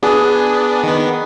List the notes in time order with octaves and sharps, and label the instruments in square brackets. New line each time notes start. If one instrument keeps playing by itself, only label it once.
[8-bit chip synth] B3 D4 [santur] G#4
[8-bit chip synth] D#3 B3